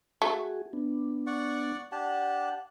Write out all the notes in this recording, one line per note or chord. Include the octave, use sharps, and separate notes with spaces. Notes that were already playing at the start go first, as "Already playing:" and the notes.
A3 F#4 G#4
B3 D4
D5 F#5 C#6
D4 G4 F#5 A5